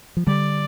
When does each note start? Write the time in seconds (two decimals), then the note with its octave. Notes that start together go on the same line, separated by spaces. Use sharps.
0.17 F3
0.27 D3 G3 D5